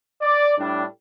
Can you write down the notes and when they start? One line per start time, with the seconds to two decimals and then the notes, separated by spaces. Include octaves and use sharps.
0.22 D5
0.58 A2 G3 D4